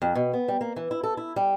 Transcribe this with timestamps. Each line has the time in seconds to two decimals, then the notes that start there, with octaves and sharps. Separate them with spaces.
0.02 F2
0.15 B2
0.33 B3
0.48 G3
0.61 A#3
0.76 E3
0.91 E4
1.03 A4
1.17 E4
1.36 G3